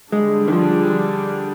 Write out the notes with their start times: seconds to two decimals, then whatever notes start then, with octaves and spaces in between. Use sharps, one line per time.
0.12 D3 G3 G#3 D4 G#4
0.48 D#3
0.53 F3